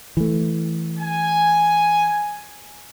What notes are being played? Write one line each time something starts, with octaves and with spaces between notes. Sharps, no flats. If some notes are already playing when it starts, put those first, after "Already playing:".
E3 A3
G#5